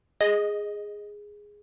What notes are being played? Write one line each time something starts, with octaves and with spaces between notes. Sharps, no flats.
G#4 D#5